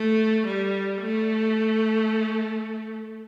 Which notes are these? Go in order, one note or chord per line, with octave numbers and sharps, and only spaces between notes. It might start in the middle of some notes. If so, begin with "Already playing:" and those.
Already playing: A3
G3
A3